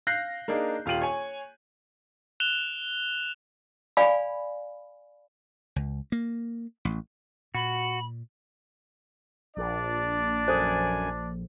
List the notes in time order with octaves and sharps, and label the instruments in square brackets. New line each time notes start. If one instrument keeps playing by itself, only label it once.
[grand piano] F5 F#6 G6 A#6 C7
A#3 D4 D#4 G#4
D#1 F4 G4 D#7 F#7
C#5 G#5
[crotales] F#6 E7 F7 G7
[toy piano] D5 F5 G#5 B5
[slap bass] C#2
A#3
A1
[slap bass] A#2 [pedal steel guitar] F#4 [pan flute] B5
[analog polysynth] A#1 [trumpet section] D4 D5
[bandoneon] F#2 G#5 [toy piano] A4 C5